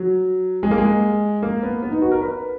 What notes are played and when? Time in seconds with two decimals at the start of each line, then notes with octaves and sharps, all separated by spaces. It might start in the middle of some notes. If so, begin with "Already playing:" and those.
Already playing: F#3
0.63 G#3
0.71 A#3
0.78 G#3
1.43 A#3
1.63 B3
1.82 B3
1.91 D#4
2.02 F#4
2.11 A#4
2.21 B4